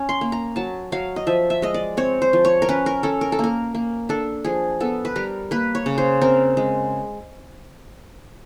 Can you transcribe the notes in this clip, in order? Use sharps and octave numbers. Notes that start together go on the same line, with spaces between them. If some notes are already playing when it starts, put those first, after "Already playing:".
Already playing: C#4
C6
A#3
A#5
F#3 A5
F#3 F5
D#5
F3 E5
E5
G#3 D#5
D5
C4 C#5
C5
F3
C#5
A#4
C#4 B4
A#4
C#4 A4
A#4
A4
A#3 A#4
A#3
D4 A4
F3 G#4
B3 A4
B4
G3 A#4
A#3 B4
C#5
C#3
C5
C4 A#4
G#3